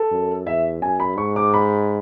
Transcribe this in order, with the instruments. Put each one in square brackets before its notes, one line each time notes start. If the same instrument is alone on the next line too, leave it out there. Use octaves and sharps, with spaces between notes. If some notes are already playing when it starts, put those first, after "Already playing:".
Already playing: [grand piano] A4
[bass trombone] F#2
[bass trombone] E2 [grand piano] E5
[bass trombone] F#2 [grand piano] G#5
[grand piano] B5
[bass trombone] G#2 [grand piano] C#6
[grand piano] D6
B5